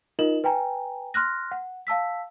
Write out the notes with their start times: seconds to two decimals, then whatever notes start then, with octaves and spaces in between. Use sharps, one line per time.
0.19 D#4 F4 A#4 D#5 E7 F#7
0.44 B4 G5 G#5 A#5
1.14 C6 F6 F#6 A#6
1.51 F#5
1.87 F5 A5 E6 B6